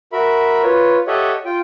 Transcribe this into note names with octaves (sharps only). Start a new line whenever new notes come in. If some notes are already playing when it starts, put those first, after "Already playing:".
F#4 A#4 E5 B5
F4 B4 C#5
G4 A4 C#5 D#5 E5 F#5
F4 G5